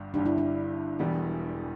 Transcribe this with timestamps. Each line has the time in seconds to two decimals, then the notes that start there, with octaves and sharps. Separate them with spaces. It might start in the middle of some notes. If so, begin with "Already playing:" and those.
Already playing: G1 G2 G3
0.14 G1 G2 D3 G3 D4
0.26 E4
0.38 D4
0.99 E1 E2 E3 G3 B3